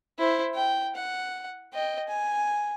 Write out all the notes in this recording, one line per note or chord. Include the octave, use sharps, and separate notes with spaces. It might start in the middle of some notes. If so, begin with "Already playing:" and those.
E4 C5
G5
F#5
D#5 G5
G#5